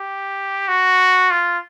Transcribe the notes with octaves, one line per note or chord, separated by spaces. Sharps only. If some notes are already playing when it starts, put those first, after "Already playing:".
Already playing: G4
F#4
F4